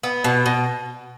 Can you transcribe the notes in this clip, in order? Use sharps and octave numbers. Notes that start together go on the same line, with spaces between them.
B3
B2
B2